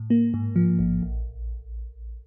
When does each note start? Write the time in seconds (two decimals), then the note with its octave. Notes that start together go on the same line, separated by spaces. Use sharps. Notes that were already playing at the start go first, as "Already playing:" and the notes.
Already playing: A2
0.10 A#3
0.34 G#2
0.56 F3
0.79 A1
1.02 A#1